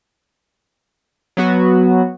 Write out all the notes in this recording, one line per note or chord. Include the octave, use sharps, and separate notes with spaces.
F#3 B3 F#4